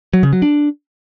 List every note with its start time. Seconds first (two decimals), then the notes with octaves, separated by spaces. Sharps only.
0.14 F#3
0.23 C#3
0.33 F#3
0.42 D4